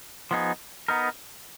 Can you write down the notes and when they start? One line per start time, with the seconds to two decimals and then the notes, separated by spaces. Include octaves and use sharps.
0.31 F3 B3 D#4 G#4
0.88 B3 D#4 A#4